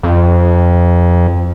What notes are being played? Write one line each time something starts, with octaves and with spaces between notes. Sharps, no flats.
F2